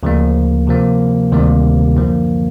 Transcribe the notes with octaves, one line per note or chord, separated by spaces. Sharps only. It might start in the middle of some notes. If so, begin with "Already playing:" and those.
D2 C#3 F3 A#3
C3 F3 A#3
D2 C3 D#3 G3 A#3
F#2 D3 F3 A#3